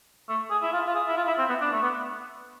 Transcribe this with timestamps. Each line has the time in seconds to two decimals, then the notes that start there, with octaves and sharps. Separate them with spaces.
0.29 A3
0.50 G#4
0.62 E4
0.73 F4
0.87 F4
0.95 G#4
1.07 E4
1.17 F4
1.27 E4
1.38 C4
1.49 B3
1.61 D4
1.72 A3
1.82 B3